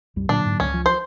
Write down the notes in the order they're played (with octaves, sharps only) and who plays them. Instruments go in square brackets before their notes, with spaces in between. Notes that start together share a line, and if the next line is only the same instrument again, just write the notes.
[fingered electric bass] C2 F#2 G3
[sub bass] A#2 [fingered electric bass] D3 F#3 A#3 [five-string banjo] D4
[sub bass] G#2
[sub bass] C#2 [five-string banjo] C#4
[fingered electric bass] F3
[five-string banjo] C5